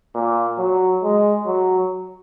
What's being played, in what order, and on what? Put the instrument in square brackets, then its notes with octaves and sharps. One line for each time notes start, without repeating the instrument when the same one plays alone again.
[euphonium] A#2
F#3
G#3
F#3